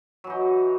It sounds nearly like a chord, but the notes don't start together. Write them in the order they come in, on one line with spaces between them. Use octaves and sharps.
F#3 E3 D#4